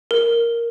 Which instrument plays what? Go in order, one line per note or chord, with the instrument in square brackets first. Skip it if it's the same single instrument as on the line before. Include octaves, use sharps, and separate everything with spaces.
[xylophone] A#4